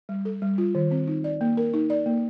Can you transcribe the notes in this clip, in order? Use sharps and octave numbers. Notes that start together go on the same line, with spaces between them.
G3
A4
G3
F4
D#3
C4
D#4
D5
A#3
A#4
D#4
D5
A#3